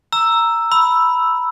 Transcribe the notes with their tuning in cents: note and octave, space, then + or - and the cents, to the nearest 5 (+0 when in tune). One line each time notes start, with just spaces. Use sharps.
A#5 -5 E6 +5
B5 +0 E6 +0